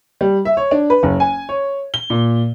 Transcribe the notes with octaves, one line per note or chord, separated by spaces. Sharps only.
G3
E5
C#5
D4
B4
F#1
G#5
C#5
G7
A#2